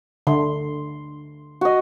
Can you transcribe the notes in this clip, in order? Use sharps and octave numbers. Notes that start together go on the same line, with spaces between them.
D3 C6
F#4 D#5